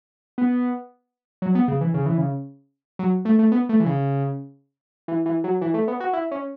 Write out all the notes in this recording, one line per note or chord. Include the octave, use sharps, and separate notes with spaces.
B3
F#3
B3
C#3
E3
C#3
E3
C#3
F#3
A3
A3
B3
A3
E3
C#3
E3
E3
F#3
E3
A3
B3
F#4
E4
C#4